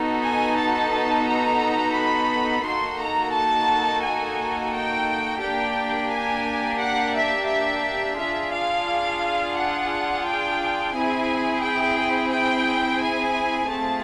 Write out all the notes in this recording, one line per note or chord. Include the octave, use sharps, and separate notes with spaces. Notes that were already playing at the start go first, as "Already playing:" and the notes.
Already playing: B3 D#4 F#4 A4
G#5
A5
A#5
B5
A#3 D#4 F#4 A4 C6
A#5
A5
G#5
G5
A#3 D4 G4 G5
G#5
F#5
E5
E5
D4 F4 G#4 E5
F5
F#5
G5
C4 E4 G#4 G#5
G5
G5
G#5
A3 C4 F4 G#4 A5